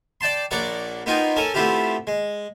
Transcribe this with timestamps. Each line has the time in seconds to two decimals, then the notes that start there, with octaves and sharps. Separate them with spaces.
0.21 D5 G5 A5 C6
0.51 A#1 A#3 C#5 D5 F#5 D6
1.06 A#3 B3 D#4 F4 G5 G#5
1.36 C#4 A4 A#4 G#5
1.54 A3 B3 C4 E4 F4 G4
2.07 G#3